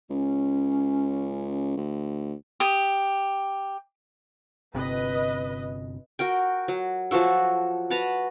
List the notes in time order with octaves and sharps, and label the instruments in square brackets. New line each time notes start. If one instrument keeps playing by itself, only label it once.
[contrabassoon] C#2 [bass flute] C#4
[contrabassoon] D2
[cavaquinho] G4 D#6
[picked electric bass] G1 C3 [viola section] B4 D#5
[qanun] F#4 A#4 G5
F#3
F3 F#3 F#4 A4
F#4 B4 A5 A#5